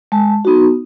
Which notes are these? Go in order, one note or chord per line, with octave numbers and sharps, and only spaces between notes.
G#3 A5
B3 D#4 F#4